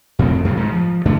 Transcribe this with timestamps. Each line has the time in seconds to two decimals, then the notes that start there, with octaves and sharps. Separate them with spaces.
0.19 F2 A2 D#3 C4
0.45 F#2 A2 C#3 E3
0.57 G#2
0.72 F3
1.05 G2 D3 A3 D4